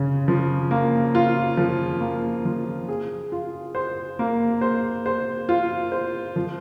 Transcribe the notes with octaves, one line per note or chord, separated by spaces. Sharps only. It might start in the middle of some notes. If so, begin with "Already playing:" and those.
Already playing: C#3
F3
A#3
F4
F3
A#3
F3
G#4
F4
C5
A#3
C5
C5
F4
C5
F3